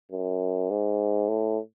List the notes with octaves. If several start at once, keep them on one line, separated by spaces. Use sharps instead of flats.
F#2
G#2
A2